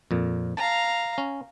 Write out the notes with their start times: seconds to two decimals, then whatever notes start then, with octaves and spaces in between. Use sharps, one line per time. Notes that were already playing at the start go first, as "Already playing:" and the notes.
0.11 F2 A#2
0.57 F5 A5 A#5
1.18 C#4